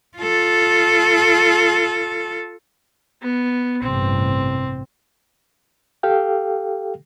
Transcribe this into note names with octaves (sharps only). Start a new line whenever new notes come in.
F4 A4
B3
A1 G2 C3 C4
G4 A4 F5 G5